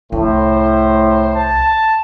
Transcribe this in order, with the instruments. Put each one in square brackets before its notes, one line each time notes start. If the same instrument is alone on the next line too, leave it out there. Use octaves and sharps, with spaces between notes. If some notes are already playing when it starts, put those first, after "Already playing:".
[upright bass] C2 [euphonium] A2 [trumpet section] C5
[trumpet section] A5